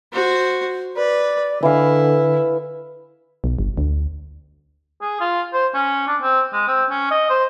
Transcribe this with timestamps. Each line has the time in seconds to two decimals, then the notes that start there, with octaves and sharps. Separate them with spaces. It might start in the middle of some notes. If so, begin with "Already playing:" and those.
0.13 F#4 C5
0.96 B4 D5
1.63 D3 E3 E4 F5
3.44 B1
3.59 G1
3.77 D2
5.02 G#4
5.21 F4
5.53 C5
5.74 C#4
6.07 D4
6.21 C4
6.53 G#3
6.68 C4
6.90 C#4
7.11 D#5
7.30 C5